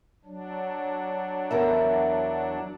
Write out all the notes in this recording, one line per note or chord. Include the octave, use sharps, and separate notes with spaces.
F#3 D4
E2 A#4 E5